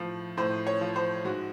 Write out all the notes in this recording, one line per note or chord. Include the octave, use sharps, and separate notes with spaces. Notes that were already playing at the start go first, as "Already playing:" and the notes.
Already playing: A2 F3
A2 C5
C#5
F3
C5
G#2 F#4